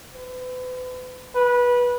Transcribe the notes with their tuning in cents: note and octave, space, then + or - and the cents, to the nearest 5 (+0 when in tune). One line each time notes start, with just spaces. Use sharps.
B4 +40
B4 -20